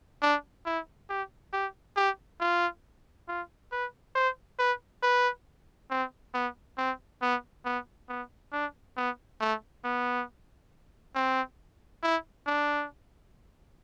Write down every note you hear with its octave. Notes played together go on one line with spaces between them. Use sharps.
D4
E4
G4
G4
G4
F4
F4
B4
C5
B4
B4
C4
B3
C4
B3
B3
B3
D4
B3
A3
B3
C4
E4
D4